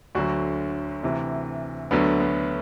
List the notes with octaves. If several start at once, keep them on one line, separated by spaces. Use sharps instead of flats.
D2 D3 F#3 F#4
D2 C3 E3
D2 D3 F#3 B3
B3